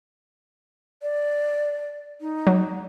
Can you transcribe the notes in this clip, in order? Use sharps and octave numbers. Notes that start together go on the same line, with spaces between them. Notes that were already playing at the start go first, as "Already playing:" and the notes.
D5
D#4
F#3